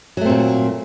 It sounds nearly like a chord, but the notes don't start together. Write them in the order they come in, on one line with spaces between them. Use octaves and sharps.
F#3 A3 C4 A#2